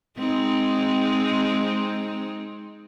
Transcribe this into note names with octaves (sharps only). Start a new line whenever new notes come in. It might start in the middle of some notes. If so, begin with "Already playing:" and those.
G#3 C4 D#4